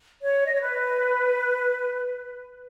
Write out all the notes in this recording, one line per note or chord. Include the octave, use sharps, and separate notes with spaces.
C#5
D#5
C#5
B4